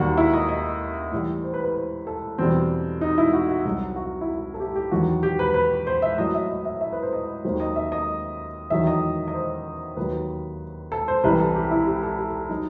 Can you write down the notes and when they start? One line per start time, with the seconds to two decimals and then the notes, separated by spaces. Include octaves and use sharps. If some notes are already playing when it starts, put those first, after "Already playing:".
Already playing: D#2 D#3 G3 F#4
0.17 E4
0.34 D#5
0.49 D#5
1.12 A2 E3 G3
1.44 C5
1.54 B4
1.65 B4
1.75 C5
2.07 A4
2.38 E2 B2 G3 C4
3.01 D#4
3.18 E4
3.33 F#4
3.49 F#4
3.65 C2 C3 F#3
3.96 F#4
4.21 E4
4.28 F#4
4.54 A4
4.60 G4
4.76 G4
4.91 E2 D#3 F#3 F#4
5.23 G4
5.39 B4
5.54 B4
5.87 C5
6.02 E5
6.17 A2 F#3 D#5
6.34 E5
6.49 D#5
6.65 E5
6.81 E5
6.93 B4
7.02 C5
7.13 D#5
7.44 D#2 D#3 F#3 C5
7.60 D#5
7.76 E5
7.92 D#5
8.70 E2 D#3 F#3 E5
8.87 D#5
9.28 D#5
9.34 C5
9.97 D#2 D#3 F#3 B4
10.92 A4
11.08 C5
11.23 C2 C3 E3 G3 B4
11.40 A4
11.55 G4
11.71 E4
11.87 G4
12.03 A4
12.19 G4
12.49 F#3 D#4